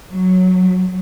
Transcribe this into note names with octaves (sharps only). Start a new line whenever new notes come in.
F#3